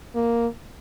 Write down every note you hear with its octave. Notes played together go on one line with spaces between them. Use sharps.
A#3